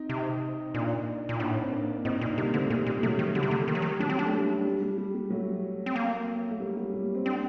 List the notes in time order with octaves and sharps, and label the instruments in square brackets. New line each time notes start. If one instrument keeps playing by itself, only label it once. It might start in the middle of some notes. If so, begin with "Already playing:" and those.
Already playing: [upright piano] C4 D#4
[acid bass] C3
[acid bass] A#2 [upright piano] A#3 D4
[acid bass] A#2
[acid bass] A2 [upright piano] A#3 D4
[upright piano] A#3
C4
A#3 D4
[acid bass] A2 [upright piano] C4 D#4
[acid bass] A#2 [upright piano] A#3 D4
[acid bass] C3 [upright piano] G3 A#3
[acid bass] D3 [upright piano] A3 C4
[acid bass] A#2 [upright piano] G3 A#3
[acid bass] A#2
[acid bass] C3 [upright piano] F#3 A3
[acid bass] D#3
[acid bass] D3 [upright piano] G3
[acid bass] C3
[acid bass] D3 [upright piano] A3
[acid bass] D#3 [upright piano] G3
[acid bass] F#3
D#3
[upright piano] F#3 [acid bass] D4
[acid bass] C4
D4
[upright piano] A3
G3
G3
G3
G3
G3
F#3 A3
[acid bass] C4
A#3
[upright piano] A3
G3 A#3
G3 A#3
G3
C4
[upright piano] A#3 D4 [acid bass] C4